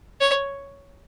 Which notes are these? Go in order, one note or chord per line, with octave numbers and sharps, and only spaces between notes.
C#5